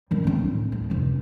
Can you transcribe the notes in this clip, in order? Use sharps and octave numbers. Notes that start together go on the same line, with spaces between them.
D#3 G3
C4 D4
A2
D#2
F1 D#3